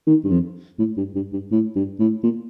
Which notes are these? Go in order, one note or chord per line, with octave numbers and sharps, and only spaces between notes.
D#3
G2
F2
A2
G2
G2
G2
A2
G2
A2
A#2